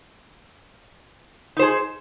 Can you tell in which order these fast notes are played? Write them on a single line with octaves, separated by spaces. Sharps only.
D#4 C5 G#4